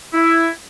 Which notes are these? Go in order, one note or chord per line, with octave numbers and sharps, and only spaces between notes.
E4